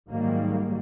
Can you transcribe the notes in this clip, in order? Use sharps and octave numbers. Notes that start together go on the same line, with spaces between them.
G#2 D#3 F#3 G3 A#3